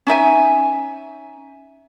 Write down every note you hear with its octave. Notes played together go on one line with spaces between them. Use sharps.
C#4 D#4 E5 G#5